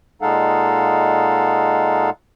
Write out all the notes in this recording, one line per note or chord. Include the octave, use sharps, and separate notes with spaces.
A#2 G#3 D#4 A4 F5 F#5